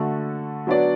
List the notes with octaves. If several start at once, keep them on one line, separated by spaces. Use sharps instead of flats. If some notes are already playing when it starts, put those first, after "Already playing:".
Already playing: D3 A3 F#4 A4
F#3 B3 D4 F#4 D5